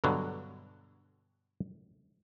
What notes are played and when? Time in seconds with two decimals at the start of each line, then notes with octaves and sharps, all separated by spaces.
0.04 G2 B2 D3 F#3